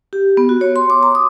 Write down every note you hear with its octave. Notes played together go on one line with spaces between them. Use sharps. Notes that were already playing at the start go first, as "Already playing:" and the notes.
G4
B3
F#4
C#5
C6
D6
A#5
D#6